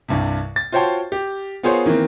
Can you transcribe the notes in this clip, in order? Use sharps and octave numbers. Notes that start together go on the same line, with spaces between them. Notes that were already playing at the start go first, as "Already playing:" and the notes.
C2 G2 C3
A6
F4 F#4 C5 C#5 G5 A5
G4
B3 F4 G#4 A#4 C5 C#5
D#3 E3 A#3 C4